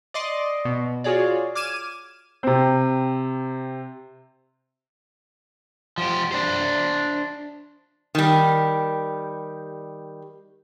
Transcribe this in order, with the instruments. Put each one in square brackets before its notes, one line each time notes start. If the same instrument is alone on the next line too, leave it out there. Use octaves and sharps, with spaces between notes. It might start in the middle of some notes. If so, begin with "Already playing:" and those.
[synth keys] D5 D#5 C6 D6
B2
F4 F#4 G#4 C#5 D5
D6 F6 G#6 D#7 E7
[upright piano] C3 C4
[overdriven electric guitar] F3 G4
D4 C5
[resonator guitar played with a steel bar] D#3 G3